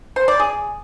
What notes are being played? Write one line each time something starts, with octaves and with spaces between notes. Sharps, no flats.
C5
D5
G#4